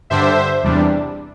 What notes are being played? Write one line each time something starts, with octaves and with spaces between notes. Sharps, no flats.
G2 D3 G3 D4 C5 E5
E2 C3 G3 D4